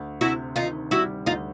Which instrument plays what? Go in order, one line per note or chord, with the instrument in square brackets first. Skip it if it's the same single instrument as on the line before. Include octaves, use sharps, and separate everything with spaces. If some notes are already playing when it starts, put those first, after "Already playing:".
Already playing: [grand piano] D2
[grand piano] C3 [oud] E4 F#4
[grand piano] D#3 [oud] D#4 F4
[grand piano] G3 [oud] E4 F#4
[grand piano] D2 [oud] D#4 F4